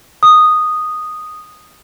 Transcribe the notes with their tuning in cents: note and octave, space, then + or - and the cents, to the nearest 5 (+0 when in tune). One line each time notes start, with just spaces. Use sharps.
D#6 -10